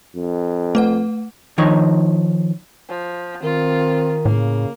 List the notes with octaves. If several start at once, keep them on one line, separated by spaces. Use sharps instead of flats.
F2
A3 B4 F#5
D#3 F3 D#4 C#5
F3
D#3 C4 F4
A2 C#3 A#3